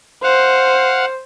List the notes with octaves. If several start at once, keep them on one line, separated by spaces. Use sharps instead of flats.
C5 F5 F#5